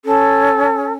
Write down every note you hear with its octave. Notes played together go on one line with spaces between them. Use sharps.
C#4 A4